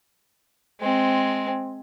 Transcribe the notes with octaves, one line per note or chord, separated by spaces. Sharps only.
G#3 C4